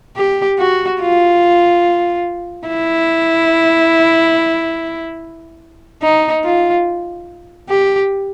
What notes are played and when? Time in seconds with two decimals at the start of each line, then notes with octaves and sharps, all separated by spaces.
0.16 G4
0.59 F#4
1.01 F4
2.68 E4
6.02 D#4
6.44 F4
7.69 G4